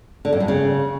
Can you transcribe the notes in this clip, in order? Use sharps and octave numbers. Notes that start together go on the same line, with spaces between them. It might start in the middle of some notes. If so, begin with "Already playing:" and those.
D3
F#2
G2
C#3